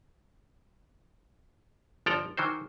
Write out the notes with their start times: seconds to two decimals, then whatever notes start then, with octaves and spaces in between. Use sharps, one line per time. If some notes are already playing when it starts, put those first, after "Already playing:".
2.06 G1 F3 A4 D5 G5 A#5
2.37 D#3 E3 F#4 C5